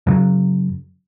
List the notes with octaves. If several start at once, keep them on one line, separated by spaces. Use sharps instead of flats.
F#2 C#3 F#3